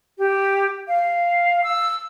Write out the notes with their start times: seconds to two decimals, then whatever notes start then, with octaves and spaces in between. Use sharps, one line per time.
0.18 G4
0.88 F5
1.64 E6